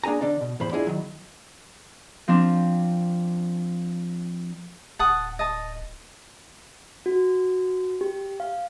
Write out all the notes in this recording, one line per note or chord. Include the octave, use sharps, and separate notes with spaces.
A#3 D4 G#4 G#5 A#5
D3 D4 D#4 D5
B2
E2 A2 C5 B5
D4 E4 F4 G#4 D#5
D#3 F#3
F3 C4 D4
D1 F#5 A5 D#6
D#5 A5
F#4
G4
F5